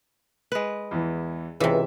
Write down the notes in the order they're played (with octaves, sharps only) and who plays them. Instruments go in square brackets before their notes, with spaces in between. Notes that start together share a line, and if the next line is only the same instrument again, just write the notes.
[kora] G#3 B4
[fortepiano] E2 E3
[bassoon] C#2 [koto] C3 E3 [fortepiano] D5 E5